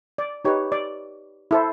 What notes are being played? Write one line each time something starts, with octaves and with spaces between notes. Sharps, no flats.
D5
D#4 G4 B4 C#5
D5
E4 A4 C5